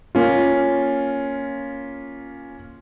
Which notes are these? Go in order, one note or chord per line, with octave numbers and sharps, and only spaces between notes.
A#3 C#4 F4